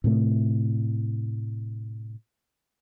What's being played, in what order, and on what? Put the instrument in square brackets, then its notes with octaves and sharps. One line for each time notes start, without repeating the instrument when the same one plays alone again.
[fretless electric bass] A2 C3 A3